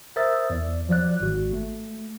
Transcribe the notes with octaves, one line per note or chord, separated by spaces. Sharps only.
A#4 C5 E5 D#6 E6 A6
E2 D5
F3 F#3 D5 F#6
G#1 F#4
A3